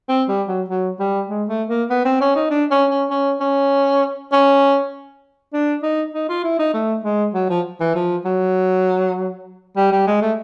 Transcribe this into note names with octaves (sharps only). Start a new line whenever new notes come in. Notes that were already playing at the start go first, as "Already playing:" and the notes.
C4
G3
F#3
F#3
G3
G#3
A3
A#3
B3
C4
C#4
D#4
D4
C#4
C#4
C#4
C#4
C#4
D4
D#4
D#4
F4
E4
D#4
A3
G#3
F#3
F3
E3
F3
F#3
G3
G3
G#3
A3